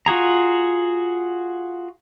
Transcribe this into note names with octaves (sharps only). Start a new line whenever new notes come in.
F4 F#4 G#4 A#5